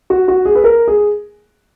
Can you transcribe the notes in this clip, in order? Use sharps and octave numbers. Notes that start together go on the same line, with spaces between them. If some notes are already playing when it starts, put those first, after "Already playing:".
F#4
F#4
G#4
B4
A#4
G#4